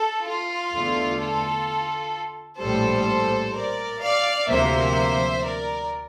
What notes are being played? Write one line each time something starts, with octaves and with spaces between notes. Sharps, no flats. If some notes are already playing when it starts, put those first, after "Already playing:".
Already playing: A4
F4
E2 D3 A3
F4 A4
A#1 A2 G3 A4 C5
A#4 D5
D5 F5
D2 C3 F3 A#3 C5 E5
A#4 D5